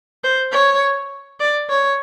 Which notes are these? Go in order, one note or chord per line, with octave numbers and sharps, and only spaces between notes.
C5
C#5
D5
C#5